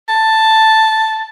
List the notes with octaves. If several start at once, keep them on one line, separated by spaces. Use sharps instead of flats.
A5